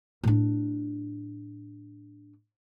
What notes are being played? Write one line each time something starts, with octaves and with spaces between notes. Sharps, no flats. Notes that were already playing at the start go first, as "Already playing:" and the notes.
A2 D4